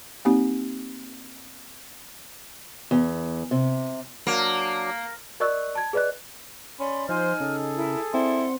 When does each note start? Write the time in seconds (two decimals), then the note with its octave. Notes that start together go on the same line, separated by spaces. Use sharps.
0.25 A#3 C4 D#4 G4
2.91 E2
3.51 C3
4.27 F#3 A#3 D4
5.40 A#4 D5 D#5 C#6 E6 F#6
5.75 A5 G#6
5.93 G#4 B4 D5 D#5 F#6
6.79 C#4 D5 B5 C6
7.09 F3 D#4 C5 G#5 F6
7.40 C#3 G#4 A4
7.77 E4 A#4
8.14 C4 E4 D5 F#5 C6